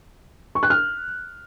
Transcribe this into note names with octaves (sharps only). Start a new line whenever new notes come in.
C#6
F#6
F6